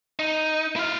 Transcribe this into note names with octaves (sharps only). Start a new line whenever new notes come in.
D#4
E4 F5